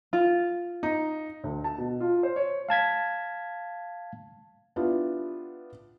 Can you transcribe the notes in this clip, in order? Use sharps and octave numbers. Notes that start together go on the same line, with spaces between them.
F4
D#4
D2
A5
B2
F4
C5
C#5
F5 A5 G#6 B6
B3 D4 E4 F4 G4